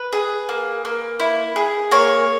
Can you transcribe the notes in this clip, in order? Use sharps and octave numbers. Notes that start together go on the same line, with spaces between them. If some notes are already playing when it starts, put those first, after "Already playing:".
Already playing: B4
G#4
A#3
A#3
E4
G#4
A#3 C#5